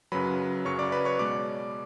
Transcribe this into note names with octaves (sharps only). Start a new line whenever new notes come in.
F#2 C#3 F#3 B4 B5
F#2 C#3 F#3 C#5 C#6
D5 D6
B4 B5
C#5 C#6
B2 G#3 D5 D6